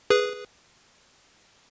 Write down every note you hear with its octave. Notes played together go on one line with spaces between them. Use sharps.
G#4 B4